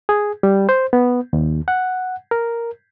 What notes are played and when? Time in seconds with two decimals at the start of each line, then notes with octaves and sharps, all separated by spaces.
0.09 G#4
0.43 G3
0.69 C5
0.93 B3
1.33 D#2
1.68 F#5
2.31 A#4